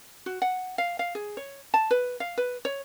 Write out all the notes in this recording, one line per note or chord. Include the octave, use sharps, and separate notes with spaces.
F#4
F#5
F5
F5
G#4
C#5
A5
B4
F5
B4
C#5